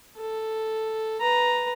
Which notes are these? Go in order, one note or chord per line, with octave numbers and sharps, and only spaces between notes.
A4
B4 A#5